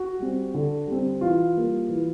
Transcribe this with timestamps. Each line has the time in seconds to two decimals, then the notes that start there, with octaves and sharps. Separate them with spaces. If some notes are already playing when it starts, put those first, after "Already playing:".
Already playing: F#4
0.19 G3 C4
0.54 D3
0.87 G3 C4
1.21 E3 F4
1.56 G3 A#3
1.89 E3